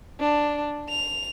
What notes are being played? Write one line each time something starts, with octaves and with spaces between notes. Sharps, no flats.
D4
F7